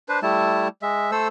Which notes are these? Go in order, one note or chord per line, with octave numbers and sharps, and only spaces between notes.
D4 B4 C5
G3 A3 E4 A5
G#3 E5
A3 A4 C5 E6